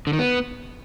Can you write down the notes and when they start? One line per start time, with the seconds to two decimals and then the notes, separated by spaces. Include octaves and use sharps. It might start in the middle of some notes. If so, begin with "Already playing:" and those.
0.07 D3
0.13 D#3
0.19 B3